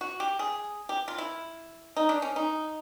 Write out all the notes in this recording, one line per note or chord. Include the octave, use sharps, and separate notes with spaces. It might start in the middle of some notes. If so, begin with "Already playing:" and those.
F#4
G4
G#4
G4
F4
E4
D#4
D4
C#4
D#4